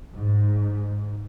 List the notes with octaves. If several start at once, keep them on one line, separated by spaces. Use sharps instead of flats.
G#2